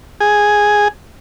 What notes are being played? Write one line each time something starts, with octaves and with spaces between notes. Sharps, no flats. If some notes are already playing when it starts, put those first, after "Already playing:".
G#4